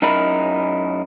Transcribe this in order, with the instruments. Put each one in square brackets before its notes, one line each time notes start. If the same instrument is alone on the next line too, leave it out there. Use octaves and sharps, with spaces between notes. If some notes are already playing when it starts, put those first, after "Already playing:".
[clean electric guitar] F#2 D#4 E4 A#4 B5